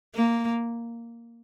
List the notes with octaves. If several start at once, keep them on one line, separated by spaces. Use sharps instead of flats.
A#3